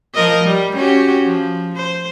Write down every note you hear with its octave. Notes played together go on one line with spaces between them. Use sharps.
F3 A#4 D#5
G3
C#4 F#4 G4
F3
C5